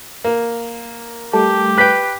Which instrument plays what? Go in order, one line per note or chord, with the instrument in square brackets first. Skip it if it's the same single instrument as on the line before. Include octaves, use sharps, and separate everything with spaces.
[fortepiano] A#3
[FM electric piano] G3 A3 [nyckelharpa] G4 [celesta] A5
[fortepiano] B4 G5 [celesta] F#6 B6